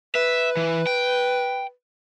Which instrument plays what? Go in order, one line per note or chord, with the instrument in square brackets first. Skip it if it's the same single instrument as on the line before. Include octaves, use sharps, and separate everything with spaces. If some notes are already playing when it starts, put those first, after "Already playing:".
[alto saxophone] B4 [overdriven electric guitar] E5
[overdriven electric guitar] E3
G5